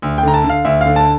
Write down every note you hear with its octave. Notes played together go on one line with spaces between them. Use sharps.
D2
G5
D3 A#5
A5
D3
F5
D2 E5
D3 F5
A5